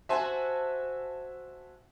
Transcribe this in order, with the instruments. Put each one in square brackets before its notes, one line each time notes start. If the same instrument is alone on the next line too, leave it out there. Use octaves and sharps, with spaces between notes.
[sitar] F#4 C5 [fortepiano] E5 G#5 A5